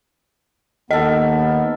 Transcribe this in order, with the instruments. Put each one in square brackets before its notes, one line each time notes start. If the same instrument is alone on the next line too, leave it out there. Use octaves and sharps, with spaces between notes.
[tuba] D#2 [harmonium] B3 [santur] A4 A#4 [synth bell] D#5